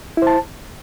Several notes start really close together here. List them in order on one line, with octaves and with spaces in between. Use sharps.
E4 C5 A5